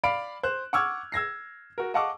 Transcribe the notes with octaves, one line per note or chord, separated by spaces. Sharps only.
D5 F5 B5 D7
C5 F#6
F#5 C#6 D6 E6 F6 G#6
E6 G#6 A#6 C7
F#4 A#4
D#5 F5 F#5 A5 C#6 D6